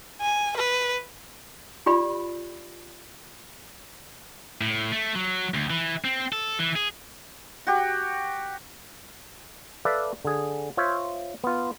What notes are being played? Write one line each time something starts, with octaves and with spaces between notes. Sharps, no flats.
G#5
B4
F4 G4 D5 B5
A2
A3
F#3
D2
E3
C4
A4
E3
G#4
F#4 G4
A4 B4 D5 E5 F5
D3 G#4
F4 C5 C#5 E5
B3 F4